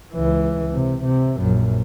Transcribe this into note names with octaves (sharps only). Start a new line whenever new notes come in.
C#2 E3
C3
C3
A#1 F#2